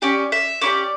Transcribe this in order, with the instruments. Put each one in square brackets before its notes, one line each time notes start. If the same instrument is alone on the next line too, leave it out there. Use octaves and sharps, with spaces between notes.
[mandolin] C#4 G4 D5
E5
C#4 E4 G4 D5